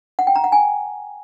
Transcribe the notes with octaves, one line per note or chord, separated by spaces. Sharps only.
F#5
G5
A#5
F#5
G#5